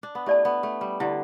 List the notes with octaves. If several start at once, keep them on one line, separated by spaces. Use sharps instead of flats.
D4
B3
A3 E4 G4 D5 A5
B3
A3
G3
D3 E4 G4 D5 A5